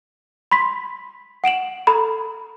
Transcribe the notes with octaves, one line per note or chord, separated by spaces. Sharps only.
B5 C6 B6
F#5 D7 E7 F#7
A4 A#5 B5